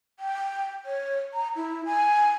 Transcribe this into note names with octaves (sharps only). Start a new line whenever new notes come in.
G5
C#5
A#5
E4
G#5